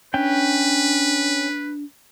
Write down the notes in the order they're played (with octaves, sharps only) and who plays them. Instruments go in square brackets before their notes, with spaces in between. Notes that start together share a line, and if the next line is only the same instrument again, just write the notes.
[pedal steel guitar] C#4 G5 [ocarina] D4 [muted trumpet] B4